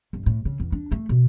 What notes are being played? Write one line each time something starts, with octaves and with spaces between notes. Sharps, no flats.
G1
A2
C#3
E2
D4
A3
B2